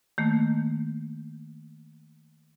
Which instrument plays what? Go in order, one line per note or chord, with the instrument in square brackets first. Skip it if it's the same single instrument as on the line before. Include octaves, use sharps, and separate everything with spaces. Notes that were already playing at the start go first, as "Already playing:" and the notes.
[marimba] D#3 A3 A#3